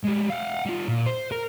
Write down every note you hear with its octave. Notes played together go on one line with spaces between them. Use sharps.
G3 G#3
F5 F#5
G3 F4
A#2
C5
A#4